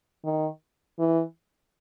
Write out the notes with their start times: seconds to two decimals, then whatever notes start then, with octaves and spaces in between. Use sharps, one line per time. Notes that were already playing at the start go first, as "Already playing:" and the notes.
0.24 D#3
0.99 E3